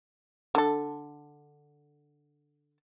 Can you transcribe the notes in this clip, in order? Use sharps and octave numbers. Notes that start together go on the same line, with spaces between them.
D3 A4